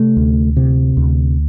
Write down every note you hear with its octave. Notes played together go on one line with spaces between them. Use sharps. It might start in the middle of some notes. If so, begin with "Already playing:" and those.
Already playing: C3 A3
D2
C3
D2